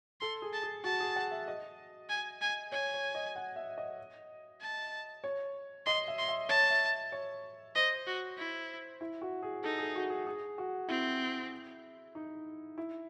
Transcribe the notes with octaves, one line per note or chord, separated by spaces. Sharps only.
A4 C6
G#4
A5
G#4
F#4 A5
G#4
F#5
E5
D#5
G#5
G#5
C#5 G#5
C#5
D#5
F#5
E5
D#5
A5
C#5
D#5 C6
E5
C6
E5
C#5 A5
E5
C#5
C5 D#5
F#4
E4
E4
F#4
G#4
D#4 A4
G#4
F#4
G#4
G#4
F#4
C4 E4
D#4
E4